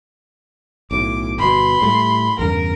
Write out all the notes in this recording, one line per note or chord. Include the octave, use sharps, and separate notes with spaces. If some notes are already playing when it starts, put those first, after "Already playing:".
B1 A2 D6
G1 B2 B5 C6
A2 G3 A3
E2 G2 C#3 A#4